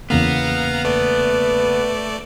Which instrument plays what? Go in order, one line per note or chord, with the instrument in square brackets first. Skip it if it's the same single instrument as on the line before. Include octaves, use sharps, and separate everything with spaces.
[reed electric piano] E2 C#3 A#3 [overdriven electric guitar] B3 [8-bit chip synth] F5 A#5
[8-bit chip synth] A3 D5 [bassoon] B4